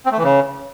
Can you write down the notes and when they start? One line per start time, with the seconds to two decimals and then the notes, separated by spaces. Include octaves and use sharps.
0.06 C4
0.12 A3
0.18 E3
0.24 C#3